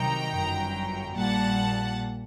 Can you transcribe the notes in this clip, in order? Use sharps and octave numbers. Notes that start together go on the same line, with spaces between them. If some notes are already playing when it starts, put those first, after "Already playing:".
Already playing: C2 C3 D#3 F#3 G5 A#5
G1 F#2 F#3
A#1 A#2 G3 F#5 A5